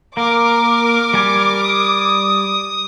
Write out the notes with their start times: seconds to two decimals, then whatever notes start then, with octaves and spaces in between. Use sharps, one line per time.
0.17 A#3 A#4 D6
1.14 G3 G#5
1.64 D#6